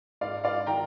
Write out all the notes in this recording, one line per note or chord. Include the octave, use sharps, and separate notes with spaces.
G#2 D5 F5
D5 F5
D#3 G5 A#5